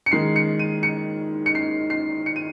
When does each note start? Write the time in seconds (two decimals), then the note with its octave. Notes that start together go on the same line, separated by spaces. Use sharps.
0.06 C#7
0.11 D#3 G#3 C7
0.36 C#7
0.59 D#7
0.83 C#7
1.46 C#7
1.55 C7
1.90 C7
2.26 C#7
2.36 D#7